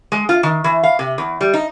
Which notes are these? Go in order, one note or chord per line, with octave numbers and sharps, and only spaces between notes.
G#3
F4
D#3
E3
F5
C3
E2
G3
D#4